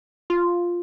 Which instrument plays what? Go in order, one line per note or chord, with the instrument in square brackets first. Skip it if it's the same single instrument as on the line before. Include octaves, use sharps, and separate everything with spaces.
[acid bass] F4